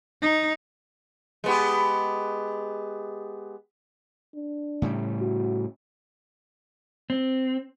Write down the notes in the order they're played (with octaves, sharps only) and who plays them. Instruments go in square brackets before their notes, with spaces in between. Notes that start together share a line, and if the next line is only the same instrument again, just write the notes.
[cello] D#4
[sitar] G#3 B3 G4
[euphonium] D4
[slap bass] A2 C#3 G3
[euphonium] F#4
[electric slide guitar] C4